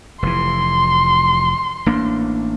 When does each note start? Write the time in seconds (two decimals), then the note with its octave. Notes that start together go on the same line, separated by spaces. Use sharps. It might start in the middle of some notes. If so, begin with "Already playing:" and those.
0.22 F1 E3 C6
1.86 A1 A#3 D4